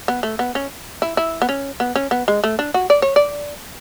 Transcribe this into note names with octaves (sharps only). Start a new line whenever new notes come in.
B3
A3
B3
C#4
E4
E4
B3
C#4
B3
C#4
B3
G#3
A3
D4
F#4
D5
C#5
D5